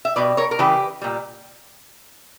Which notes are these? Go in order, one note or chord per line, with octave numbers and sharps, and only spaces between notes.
E5
B2 G3 B4 D5
A#4 C#5
A#4
C#3 E3 G3 G4 B4
A#2 G3